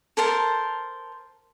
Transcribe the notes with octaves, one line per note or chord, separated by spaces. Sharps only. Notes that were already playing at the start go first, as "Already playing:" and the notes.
A4 A#4 C5 A5